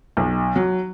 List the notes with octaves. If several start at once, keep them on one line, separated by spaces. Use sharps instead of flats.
B1
F#3